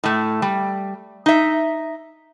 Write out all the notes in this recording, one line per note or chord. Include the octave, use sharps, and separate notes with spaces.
A2 A3
G3
D#4 E5